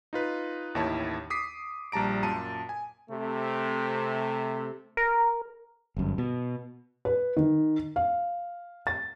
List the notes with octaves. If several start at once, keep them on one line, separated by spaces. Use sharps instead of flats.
D#4 F4 B4
A1 D#2 D#3 E4 C#5 A5
D6 D#6 B6 C7
A#1 G3 A5 A#5 D7
F#2 A#2 A5 D#7
G#5
C3 A3
A#4
G1 F#2
B2
B4
D#3
F5
A6